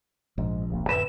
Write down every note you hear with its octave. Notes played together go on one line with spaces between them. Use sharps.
A#1 G#2
D1 C2 A#3
F2 A2 D3 B4 E5 E7